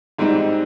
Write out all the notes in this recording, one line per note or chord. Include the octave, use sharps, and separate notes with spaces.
G#2 G3 C4 D#4